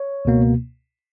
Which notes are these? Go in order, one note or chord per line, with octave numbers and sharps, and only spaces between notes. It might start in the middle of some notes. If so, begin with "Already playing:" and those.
Already playing: C#5
C#2 B2 A#3